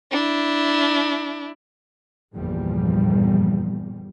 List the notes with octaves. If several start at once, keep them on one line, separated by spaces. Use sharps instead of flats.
D4 E4
G1 E2 A#2 F3 G3